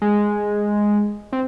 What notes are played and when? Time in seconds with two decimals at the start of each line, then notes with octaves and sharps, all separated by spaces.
0.02 G#3
1.33 C4